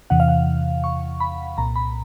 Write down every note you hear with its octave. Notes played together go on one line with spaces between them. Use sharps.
E2 C3 E3 F#5
F5
F#5
C#6
B5
C2 A#2 A#5
B5